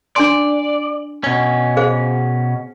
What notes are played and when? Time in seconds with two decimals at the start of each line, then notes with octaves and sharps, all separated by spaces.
0.16 D4 D5 G#5 C6
1.24 B2 C#4
1.77 G#4 C5 F5